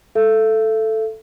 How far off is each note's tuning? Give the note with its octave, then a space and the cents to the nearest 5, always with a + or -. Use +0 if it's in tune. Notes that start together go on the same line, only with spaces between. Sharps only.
A4 +0 E5 +40